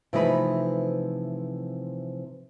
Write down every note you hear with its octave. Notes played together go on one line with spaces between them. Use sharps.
C3 E3 F3 A3 D#4 B4